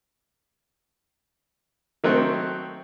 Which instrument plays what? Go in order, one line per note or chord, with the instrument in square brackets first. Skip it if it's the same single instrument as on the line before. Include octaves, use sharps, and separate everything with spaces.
[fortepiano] D#3 F#3 A3 C4